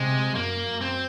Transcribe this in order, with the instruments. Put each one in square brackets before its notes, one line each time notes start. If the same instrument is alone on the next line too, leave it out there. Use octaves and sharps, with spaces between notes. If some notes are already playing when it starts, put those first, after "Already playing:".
Already playing: [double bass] C3 [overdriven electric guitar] G#3
[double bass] F#2 [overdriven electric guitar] A#3
[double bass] F#2
[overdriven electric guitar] C4